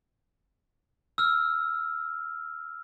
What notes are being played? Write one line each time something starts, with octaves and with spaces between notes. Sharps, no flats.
E6 F6